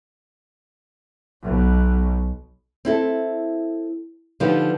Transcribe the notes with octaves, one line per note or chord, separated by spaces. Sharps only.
B1 B2
C4 E4 A4
D3 F3 D#4 F4 G4 B4